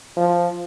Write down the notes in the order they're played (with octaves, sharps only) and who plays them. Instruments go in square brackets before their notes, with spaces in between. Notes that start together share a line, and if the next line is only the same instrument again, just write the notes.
[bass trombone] F3